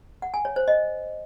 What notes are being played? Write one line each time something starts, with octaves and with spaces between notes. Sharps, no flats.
F#5
G#5
C#5
C5
D#5